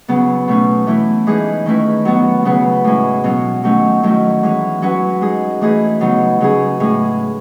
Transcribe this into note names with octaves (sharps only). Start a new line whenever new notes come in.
C#3 F#3 B3
B2 A3 C#4
E3 A3 E4
E3 G#3 D#4 G#4 B4
D#3 A3 C#4 E4 B4
F#3 B3 F#4
C#3 F#3 B3 F#4 B4
A2 G#3 C#4 E4
B2 F#3 C#4
D#3 F#3 A3 C#4
D#3 F#3 A3 E4
E3 G#3 C#4
F#3 C#4 F#4 B4
G#3 D#4 G#4
E3 A3 D#4 G#4 B4
C#3 F#3 B3 D#4
C#3 F#3 C#4 G#4
A2 G#3 C#4 G#4